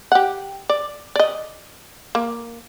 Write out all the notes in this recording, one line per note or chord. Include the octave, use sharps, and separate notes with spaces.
G4 F#5
D5
D5 D#5
A#3